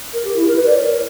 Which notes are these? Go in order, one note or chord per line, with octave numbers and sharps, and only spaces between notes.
A#4
G4
E4
A#4
B4
D5
C#5
A#4